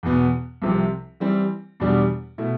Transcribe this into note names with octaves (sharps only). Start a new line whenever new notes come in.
E2 B2 B3
C2 C3 F3 C4 G4
E3 G3 C4
E2 B2 G3 D4 G4
B2 A3 E4